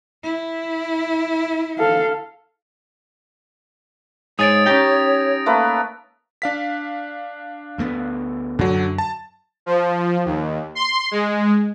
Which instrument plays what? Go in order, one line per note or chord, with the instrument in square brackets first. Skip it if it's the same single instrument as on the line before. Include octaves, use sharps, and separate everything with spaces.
[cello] E4
[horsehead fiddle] A4 F5
[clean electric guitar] G#2 G#4 [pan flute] C#5 [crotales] D#6 A6 D7
[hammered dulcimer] C#4 D#4 [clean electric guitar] G4 G5 [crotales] A#6
[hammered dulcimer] A3 A#3 B4
[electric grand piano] D4 F5 B6
[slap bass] D2 A3 B3
[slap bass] F#2 [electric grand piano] D3 F#3
[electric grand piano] A5
[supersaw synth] F3
D#2
C6
G#3